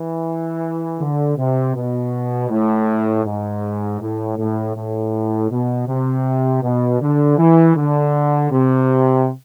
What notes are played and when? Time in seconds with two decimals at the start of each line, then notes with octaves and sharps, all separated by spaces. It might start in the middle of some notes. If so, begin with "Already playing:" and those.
Already playing: E3
1.00 D3
1.37 C3
1.75 B2
2.50 A2
3.25 G#2
4.00 A2
4.37 A2
4.75 A2
5.50 B2
5.87 C3
6.62 B2
7.01 D3
7.37 E3
7.75 D3
8.51 C3